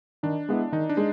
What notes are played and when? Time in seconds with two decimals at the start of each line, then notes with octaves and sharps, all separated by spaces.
0.23 D#3 D4
0.49 G#3 B3 E4
0.72 D#3 D#4
0.89 D4
0.97 G#3